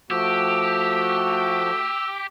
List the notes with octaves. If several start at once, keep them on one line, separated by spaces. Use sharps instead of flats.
F3 A3 F#4 G4 E6